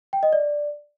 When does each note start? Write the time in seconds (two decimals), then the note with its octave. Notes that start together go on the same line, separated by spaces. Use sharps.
0.13 G5
0.23 D#5
0.33 D5